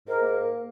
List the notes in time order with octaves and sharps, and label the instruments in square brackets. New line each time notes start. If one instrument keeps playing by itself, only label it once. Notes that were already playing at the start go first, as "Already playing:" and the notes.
[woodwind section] G#2 [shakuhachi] A#4
[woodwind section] A#3